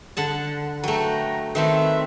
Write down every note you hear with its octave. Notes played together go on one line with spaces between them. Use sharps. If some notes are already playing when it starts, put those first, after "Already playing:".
D3 F#5 A5
F#3 A3 B4 G5 A#5
D#3 A3 C4 B4 E5